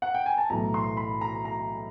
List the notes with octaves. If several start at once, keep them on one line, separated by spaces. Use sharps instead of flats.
F#5
G5
G#5
A5
B1 A2 E3 A#5
C6
B5
A#5
A#5